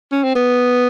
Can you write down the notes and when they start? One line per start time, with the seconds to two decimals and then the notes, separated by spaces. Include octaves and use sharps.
0.12 C#4
0.23 C4
0.35 B3